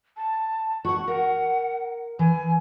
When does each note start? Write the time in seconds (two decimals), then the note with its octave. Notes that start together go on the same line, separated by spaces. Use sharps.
0.17 A5
0.85 F#4 F#5 C#6
1.08 A#4 F#5
2.19 E3 G#5